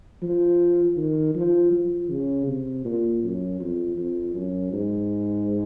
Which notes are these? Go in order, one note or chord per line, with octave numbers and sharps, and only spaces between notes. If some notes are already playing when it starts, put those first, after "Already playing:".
F3
D#3
F3
F3
C#3
C3
A#2
F#2
F2
F2
F#2
G#2